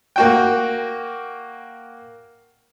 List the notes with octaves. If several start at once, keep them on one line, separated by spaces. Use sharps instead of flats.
A#3 F#4 G5